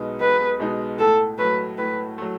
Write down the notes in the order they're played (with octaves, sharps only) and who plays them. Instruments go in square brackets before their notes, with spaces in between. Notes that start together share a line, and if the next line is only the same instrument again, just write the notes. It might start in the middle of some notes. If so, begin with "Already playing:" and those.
Already playing: [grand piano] B1 B2 G#3 B3 D#4
[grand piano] B1 [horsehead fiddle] B4
[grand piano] B2 G#3 B3 D#4
[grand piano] A2 [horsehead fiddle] A4
[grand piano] F#3 A3 [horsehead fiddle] B4
[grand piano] A2 [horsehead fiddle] B4
[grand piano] F#3 A3